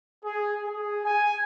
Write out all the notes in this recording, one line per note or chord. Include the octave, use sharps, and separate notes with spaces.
G#4
G#4
G#5